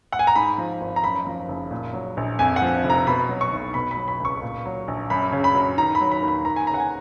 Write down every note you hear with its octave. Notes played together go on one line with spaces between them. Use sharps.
F#5
G#5
A#5
G#2 B5
F3
G#1
A#5
F#2 B5
F3
F#1
A#2
F#3
A#1
F2 G#5
F#5
F3
F1
A#5
B2 B5
F#3
C#6
B1
B2 B5
B5
F#3
B5
C#2 C#6
A#2
F#3
A#1
F#2 B5
C#3
B5
F#3
D#3 A#5
B5
F#3
B5
D#2
B5
D#2 A#5
G#5
C#3 A#5
F#5
G#5